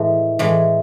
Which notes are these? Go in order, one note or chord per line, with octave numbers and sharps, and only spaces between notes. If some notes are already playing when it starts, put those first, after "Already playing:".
Already playing: A2 E3 G#3
A2 E3 G#3